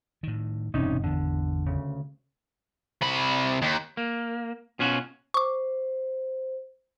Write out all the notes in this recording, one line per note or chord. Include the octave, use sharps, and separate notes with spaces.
A2 D#3
E1 G2 C3 C#4 D#4
G#1 E2 D3 B3
D2 C#3
C3 B5
D#2
A#3
B2 C#4 F4 F#4
C5 C#6 D6